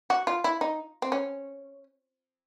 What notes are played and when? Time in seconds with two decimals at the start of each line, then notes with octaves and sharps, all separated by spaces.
0.10 F#4
0.27 F4
0.44 E4
0.61 D#4
1.02 C4
1.12 C#4